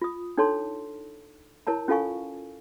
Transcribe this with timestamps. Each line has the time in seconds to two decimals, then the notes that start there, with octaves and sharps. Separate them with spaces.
0.02 F4 D#6
0.37 D4 D#4 A4 C#5 A5 C6
1.67 E4 A#4 C#5 A5 A#5
1.88 C#4 F4 A4 F5 G#5 C#6